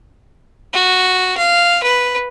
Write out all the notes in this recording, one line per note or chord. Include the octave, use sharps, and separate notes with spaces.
F#4
F5
B4